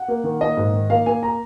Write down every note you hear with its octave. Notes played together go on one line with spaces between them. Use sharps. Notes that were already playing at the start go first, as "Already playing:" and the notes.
Already playing: F#5
A#3
D#3
A#3 D#5
G#2
D#3
A#3 F5
A#3 G#5
A#5